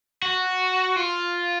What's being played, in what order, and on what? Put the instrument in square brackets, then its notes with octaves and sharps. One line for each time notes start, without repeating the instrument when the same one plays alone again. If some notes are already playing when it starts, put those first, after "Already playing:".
[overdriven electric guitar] F#4
F4